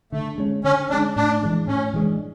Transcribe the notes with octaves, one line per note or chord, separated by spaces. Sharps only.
D3 A3
G#3 C#4
D3 C#4
G#3 C#4 D4
A2 D4
E3 G#3 D4
A2 C#4
E3 G#3 D4